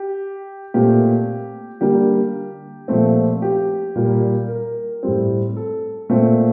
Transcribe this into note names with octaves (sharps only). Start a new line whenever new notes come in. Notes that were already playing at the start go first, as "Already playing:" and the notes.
Already playing: G4
A#2 A3 C4 G4
D3 G3 A#3 G4
A#2 F3 A3 C4
G4
A#2 G3 A#3
A#4
A2 G3 C4
A4
A#2 A3 C4